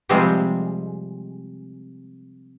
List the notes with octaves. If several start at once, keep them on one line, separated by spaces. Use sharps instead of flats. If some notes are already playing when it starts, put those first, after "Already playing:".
C3 F3 G3 G#3 C4